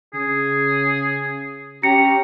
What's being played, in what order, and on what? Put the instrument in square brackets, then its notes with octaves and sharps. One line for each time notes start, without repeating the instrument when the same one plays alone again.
[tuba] C#3 [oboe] G#4
[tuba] C#4 [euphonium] G4 [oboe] A#5 [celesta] C#7